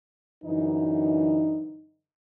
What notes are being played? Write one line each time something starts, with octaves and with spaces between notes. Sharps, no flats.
F#2 D3 E3 D#4